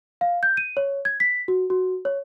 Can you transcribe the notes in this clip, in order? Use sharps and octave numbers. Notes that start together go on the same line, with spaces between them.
F5
G6
D#7
C#5
G#6
B6
F#4
F#4
C#5